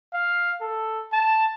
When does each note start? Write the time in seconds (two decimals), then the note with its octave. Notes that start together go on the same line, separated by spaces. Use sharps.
0.13 F5
0.61 A4
1.13 A5